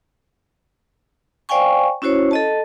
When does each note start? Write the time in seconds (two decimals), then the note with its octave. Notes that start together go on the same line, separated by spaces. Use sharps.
1.49 C5 D5 F5 G5 G#5 C#6
2.02 C#4 E4 F#4 C5 C#5
2.31 A4 D#5 A5